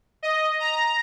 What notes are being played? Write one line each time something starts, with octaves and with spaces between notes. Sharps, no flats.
D#5
A#5